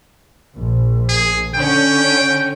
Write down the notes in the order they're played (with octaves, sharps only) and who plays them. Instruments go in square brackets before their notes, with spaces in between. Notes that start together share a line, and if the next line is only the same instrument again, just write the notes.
[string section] A#1
[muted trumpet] G#4
[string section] D3 C#4 [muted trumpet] G5